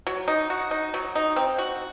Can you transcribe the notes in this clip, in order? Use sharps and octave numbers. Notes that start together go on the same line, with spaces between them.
F#3
D#4
F#4
D#4
F#3
D#4
C4
F#4